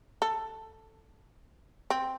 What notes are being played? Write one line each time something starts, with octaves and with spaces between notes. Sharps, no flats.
A4
C4